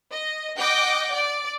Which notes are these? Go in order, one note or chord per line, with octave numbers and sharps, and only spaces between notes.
D#5
D#5 F#5 G5 D6 G6
D5